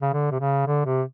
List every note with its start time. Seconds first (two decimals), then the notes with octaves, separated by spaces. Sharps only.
0.02 C#3
0.13 D3
0.31 C3
0.40 C#3
0.67 D3
0.86 C3